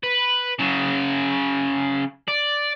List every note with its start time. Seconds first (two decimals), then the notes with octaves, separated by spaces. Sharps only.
0.03 B4
0.59 C#3 F#3
2.28 D5